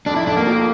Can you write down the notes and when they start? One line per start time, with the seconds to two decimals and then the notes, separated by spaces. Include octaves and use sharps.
0.06 F2 D4
0.16 E4
0.26 F1 D4
0.37 A#3
0.47 F3